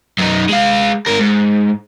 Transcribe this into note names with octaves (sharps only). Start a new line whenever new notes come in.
F#2 D#4
G#3 F5
G#2 A#4
G#2